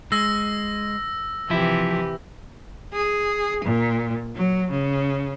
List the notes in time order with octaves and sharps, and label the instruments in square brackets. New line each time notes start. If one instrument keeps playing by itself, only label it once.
[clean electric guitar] G#3 [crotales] E6 A#6
[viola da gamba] C3 E3 G4 [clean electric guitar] F3 E4
[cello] G#4
A#2
F#3
C#3